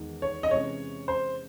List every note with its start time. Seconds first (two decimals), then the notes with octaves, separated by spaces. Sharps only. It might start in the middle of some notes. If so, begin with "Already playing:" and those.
Already playing: E2 D#3 G#3 D#4
0.22 C#5
0.43 D#5
0.51 C3 E3 G#3 C#4 C#5
1.08 C5